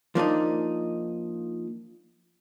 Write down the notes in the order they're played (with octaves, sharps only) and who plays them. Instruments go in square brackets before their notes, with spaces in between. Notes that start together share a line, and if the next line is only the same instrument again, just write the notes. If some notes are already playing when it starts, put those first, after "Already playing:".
[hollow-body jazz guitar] F3 A#3 D4 D#4